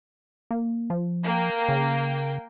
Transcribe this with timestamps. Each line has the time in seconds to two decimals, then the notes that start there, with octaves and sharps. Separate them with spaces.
0.51 A#3
0.90 F3
1.22 A#3 G5
1.69 C#3